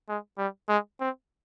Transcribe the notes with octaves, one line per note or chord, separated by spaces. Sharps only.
G#3
G3
G#3
C4